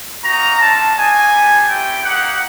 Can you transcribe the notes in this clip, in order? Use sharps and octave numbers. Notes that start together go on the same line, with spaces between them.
A#3 D#4 F#4 A#5
A3 D4 F4 A5
A#3 D#4 F#4 G#5
G3 B3 D4
A3 C4 E4 G4 G5
A#3 D#4 G4 F#5